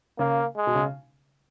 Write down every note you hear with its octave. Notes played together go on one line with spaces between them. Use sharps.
C#3 A#3
G#3
B2
C#3